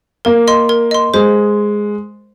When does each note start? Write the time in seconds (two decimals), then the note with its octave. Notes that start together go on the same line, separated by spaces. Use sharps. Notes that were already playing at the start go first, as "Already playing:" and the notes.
0.25 A#3 A#4
0.48 D#5 C6
0.69 A#4
0.91 D#5 C6
1.14 G#3 C5